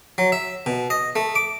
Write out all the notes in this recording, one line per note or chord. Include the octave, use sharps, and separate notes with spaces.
F#3
E5
B2
D#5
A3
D6